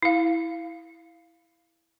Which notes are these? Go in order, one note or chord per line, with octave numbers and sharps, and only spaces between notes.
E4 F5